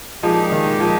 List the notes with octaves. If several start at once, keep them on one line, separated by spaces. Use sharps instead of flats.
A#2 F3 G#3 D#4 G4
D#3
F3